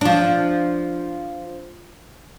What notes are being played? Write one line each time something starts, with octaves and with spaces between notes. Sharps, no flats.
F3 D4